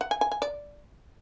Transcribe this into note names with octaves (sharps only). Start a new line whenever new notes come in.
F#5
G#5
G#5
G#5
D5